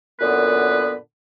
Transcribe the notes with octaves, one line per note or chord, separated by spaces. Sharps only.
F#2 A#2 D3 B3 B4